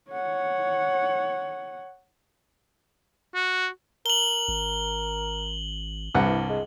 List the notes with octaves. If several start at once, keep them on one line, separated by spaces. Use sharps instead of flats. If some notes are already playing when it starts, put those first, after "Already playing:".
C#5 F#5
F#4
A#4 F#7 G7
G#1
C2 G2 E3 F#5
G#3